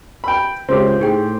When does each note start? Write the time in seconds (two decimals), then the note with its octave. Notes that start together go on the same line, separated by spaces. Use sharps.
0.24 G5 B5
0.69 C#2 C4 F4 G4
1.00 A2 D#4 G#4 G5